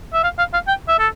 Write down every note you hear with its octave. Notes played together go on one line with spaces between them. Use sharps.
E5
F5
F5
F5
G5
E5
A4